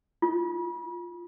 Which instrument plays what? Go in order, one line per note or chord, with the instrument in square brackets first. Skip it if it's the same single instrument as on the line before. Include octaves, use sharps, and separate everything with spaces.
[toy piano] F4